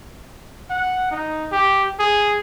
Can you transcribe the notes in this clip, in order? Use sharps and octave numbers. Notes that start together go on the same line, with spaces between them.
F#5
D#4
G4
G#4